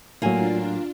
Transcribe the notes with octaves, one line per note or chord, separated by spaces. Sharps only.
A2 F#3 A#3 D4 F4 G#5